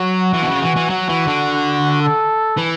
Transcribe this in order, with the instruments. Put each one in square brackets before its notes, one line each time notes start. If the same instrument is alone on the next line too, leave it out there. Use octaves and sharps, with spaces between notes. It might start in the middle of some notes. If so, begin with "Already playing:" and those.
Already playing: [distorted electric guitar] F#3 [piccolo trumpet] F#4
[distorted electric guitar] E3
B2
C#3
E3
E3
[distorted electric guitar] F#3 [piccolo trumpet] F#4
[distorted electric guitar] E3
D3
[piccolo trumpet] A4
[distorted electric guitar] E3